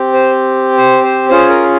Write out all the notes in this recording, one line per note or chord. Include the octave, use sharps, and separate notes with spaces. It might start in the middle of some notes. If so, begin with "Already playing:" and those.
Already playing: C4 G4
C5
C5
C5
C#4 F4 G#4 C5
A#4